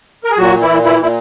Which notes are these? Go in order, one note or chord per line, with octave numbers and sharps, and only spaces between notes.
A#4
G#4
A#2 F#3 F#4
E3 E4
A#2
E3 E4
A#2 E4